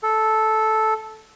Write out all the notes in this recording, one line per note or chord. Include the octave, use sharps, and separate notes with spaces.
A4